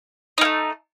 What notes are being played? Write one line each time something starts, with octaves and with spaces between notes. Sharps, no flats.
A3 A#3 D#4